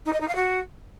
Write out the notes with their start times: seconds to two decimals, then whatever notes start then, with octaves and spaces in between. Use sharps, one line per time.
0.05 D#4
0.13 D#5
0.20 D#4
0.28 F5
0.35 F#4